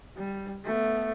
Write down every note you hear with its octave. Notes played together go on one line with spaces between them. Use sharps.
G3
A3 B3